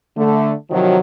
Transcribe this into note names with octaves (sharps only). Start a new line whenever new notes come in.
D3 A3
C3 D#3 F3 F#3